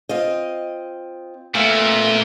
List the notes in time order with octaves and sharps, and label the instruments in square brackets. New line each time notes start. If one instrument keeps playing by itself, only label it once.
[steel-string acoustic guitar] C4 F4 D#5
[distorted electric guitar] A#2 [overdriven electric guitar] A3 B3 [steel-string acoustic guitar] F5